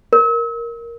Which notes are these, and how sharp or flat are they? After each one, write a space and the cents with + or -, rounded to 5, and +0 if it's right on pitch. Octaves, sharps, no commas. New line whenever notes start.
A#4 +5